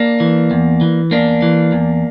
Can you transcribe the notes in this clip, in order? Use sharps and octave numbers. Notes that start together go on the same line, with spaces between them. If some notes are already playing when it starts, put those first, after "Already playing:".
Already playing: A#3 D4
E3
E2
E3
E2 A#3 D4
E3
E2